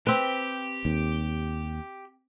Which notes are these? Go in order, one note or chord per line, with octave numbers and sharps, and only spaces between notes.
C4 G4 B4
D#2